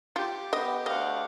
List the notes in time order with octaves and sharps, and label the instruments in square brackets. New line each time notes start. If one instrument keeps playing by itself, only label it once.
[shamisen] F4 [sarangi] G4
[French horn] B3 [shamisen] D#5
[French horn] D2 [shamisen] D#5 [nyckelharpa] F5 F#5